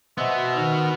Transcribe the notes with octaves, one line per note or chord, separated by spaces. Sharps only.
B2 B3 C5 D#5 E5
D#3 F6